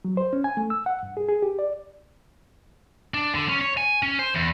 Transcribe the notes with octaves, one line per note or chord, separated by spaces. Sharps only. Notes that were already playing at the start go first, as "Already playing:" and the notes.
F#3
C5
C#4
G#5
A3
E6
F#5
G2
G#4
G#4
G4
D5
D4
D3
C#4
C#5
G#5
C#4
C5
E2